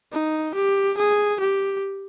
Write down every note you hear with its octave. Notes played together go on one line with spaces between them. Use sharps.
D#4
G4
G#4
G4